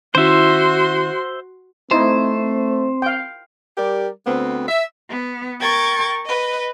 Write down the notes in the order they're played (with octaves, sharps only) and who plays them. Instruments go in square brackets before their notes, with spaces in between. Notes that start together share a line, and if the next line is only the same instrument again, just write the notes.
[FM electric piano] D#3 C#4 E4 [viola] F#4 C6 [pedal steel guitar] C5 E5
[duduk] A3 [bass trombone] C4 [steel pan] D#4 E4 [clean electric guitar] C5
[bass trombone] C4
[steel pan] F5 G5
[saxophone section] G3 G4 A#4 D5
D2 B3 C4
E5
[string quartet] B3
A#4 G5 C#6 G#6 A6
B4 D#5